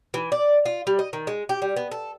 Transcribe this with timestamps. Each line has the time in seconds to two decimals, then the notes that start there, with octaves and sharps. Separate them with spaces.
0.14 E3
0.32 D5
0.66 F4
0.87 G3
0.99 D#5
1.13 D#3
1.27 G#3
1.49 G4
1.62 G3
1.77 B3
1.91 A4